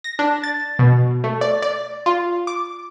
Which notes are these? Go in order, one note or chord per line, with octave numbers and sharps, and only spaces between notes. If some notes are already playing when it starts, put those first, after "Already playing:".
A#6
D4
A6
B2
A3
D5
D5
F4
D6